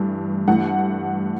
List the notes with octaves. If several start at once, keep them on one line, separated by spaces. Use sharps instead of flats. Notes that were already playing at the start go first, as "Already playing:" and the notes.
Already playing: G2 E3 A3
G2 E3 A3 F#5